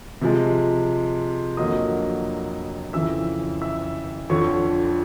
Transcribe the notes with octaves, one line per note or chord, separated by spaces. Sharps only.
C3 F3 G#3
F2 D3 F#3 A#3 D#5 D#6
F2 C#3 E3 E5 E6
E5 E6
F2 D3 F3 C#5 C#6